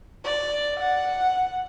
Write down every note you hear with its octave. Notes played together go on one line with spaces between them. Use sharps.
D5
F#5